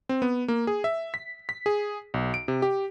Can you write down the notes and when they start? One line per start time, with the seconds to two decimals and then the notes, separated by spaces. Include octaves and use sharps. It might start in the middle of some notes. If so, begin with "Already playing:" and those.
0.09 C4
0.22 B3
0.48 A#3
0.67 G#4
0.84 E5
1.14 B6
1.49 B6
1.66 G#4
2.14 B1
2.34 D7
2.48 C3
2.62 G4